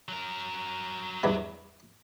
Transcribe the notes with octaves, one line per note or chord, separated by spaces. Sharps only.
F#3 A#4
E2 G2 E4